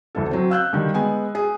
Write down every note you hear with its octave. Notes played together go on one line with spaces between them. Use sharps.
D2 E3 A4
F#3 C4
F5 E6 F#6 G6
D3 D#3 G3
G#3 B3 G#5
G#4